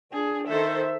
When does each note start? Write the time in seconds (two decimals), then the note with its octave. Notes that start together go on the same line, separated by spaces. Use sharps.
0.12 D4 G#4
0.48 D#3 A4 C5 E5